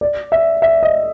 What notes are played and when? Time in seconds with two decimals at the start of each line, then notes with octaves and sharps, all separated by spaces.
0.01 D5
0.32 E5
0.62 E5
0.83 D#5